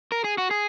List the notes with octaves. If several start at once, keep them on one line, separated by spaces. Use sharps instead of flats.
A#4
G#4
F#4
G#4